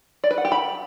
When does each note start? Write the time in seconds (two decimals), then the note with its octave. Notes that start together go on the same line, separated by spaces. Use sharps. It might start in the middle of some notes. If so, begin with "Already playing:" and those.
0.24 D5
0.31 B4
0.38 F#5
0.45 G4
0.52 B5